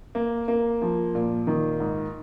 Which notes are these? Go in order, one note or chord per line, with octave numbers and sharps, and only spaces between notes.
A#3
A#3
F3
A#2
D#3
G#2